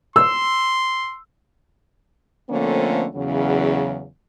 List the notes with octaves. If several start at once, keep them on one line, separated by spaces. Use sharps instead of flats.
C6 E6
D3 F3 A3 A#3 C4 C#4
E2 C#3 F#3